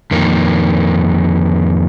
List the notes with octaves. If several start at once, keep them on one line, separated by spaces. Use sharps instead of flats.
F2 D#3 A#3